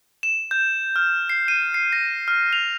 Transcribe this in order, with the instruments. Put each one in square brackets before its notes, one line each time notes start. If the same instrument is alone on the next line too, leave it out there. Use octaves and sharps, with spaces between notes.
[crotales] E7
G6
F6
C7
D#7
C7
A#6
F6
F7